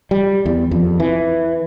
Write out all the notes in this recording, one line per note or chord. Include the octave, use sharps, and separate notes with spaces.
G3
E2
F2
E3